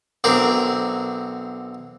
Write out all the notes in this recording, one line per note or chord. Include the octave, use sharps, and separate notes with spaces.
B1 D3 C4 A#4